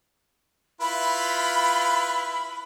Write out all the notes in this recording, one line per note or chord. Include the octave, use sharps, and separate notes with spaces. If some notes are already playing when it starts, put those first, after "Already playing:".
E4 F4 B4 B5